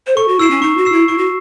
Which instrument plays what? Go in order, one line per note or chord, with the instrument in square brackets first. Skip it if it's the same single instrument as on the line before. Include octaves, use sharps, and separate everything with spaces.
[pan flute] C5
[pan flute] A4 [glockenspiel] C#6
[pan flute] F#4
[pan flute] E4 [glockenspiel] E6 C7 E7
[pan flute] C#4
[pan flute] D#4 [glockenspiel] C#6
[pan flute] F#4
[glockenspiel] E6 C7 E7
[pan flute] E4
[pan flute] E4 [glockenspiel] C#6
[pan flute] F#4